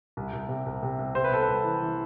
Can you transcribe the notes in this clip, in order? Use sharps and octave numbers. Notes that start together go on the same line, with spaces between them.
C2
C2
C3
C2
C3
C2
C3 C5
B4
C3 A4
B4
C2
E3
E3